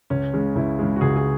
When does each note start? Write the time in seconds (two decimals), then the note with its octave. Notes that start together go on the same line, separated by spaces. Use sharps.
0.10 C#2 C#4
0.34 C#3 G#3
0.55 C#2 E4
0.79 C#3 G#3
0.96 F#4
1.01 C#2 G#4
1.16 G#4